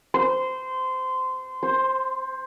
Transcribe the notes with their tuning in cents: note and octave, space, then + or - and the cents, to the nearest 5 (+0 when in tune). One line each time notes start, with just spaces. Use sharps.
C5 -20
C5 +10